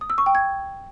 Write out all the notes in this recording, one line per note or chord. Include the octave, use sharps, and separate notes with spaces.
D#6
E6
C#6
G5
G#6